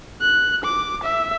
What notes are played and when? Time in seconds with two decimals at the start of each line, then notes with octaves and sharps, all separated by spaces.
0.22 F#6
0.64 D6
1.04 E5